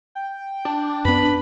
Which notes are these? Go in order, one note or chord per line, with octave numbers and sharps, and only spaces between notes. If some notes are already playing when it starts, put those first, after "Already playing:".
G5
D4
F#2 B3 B4 B5